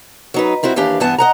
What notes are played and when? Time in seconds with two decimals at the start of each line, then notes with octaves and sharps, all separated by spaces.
0.34 F#3 D#4 B4
0.63 G3 C4 E4 F#4
0.76 D#2 E3 D4 G4 F5
1.00 G2 E3 B3 F#5 A5
1.18 D#5 F#5 A#5